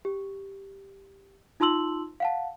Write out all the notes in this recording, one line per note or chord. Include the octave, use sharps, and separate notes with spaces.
G4
D#4 F4 A5 C6 E6 F#7
F5 F#5 A5